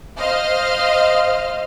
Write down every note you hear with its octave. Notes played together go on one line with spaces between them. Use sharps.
C5 D#5 F5 F6